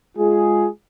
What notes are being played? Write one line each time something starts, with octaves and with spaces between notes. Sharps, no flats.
G#3 F4 G#4